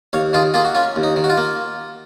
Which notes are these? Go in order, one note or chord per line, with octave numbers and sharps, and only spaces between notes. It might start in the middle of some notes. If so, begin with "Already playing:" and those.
D#2 C#5 F5
D#3 F4 G#4
A#3 F4 G#4
F#4
C#4 F4
D#2
D#4
D#3
F#4
F4
A#3